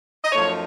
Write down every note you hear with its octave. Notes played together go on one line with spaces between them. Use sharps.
D#5
F#2 F3 A3 D#4 C#5